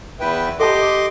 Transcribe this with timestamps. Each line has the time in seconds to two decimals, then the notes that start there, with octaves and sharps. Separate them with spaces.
0.20 E2 E4 B4 G5
0.60 G4 A4 D#5 A5 C6 D6